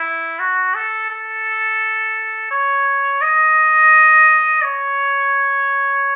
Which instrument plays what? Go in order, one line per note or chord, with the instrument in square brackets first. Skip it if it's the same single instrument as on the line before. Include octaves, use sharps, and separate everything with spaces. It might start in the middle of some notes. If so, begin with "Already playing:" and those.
Already playing: [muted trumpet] E4
F#4
A4
A4
C#5
D#5
C#5